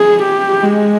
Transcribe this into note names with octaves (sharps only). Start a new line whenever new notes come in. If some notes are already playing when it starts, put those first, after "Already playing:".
Already playing: G#4
G4
G#3